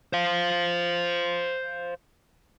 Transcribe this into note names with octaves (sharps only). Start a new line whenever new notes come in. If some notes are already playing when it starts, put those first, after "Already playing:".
C5 F5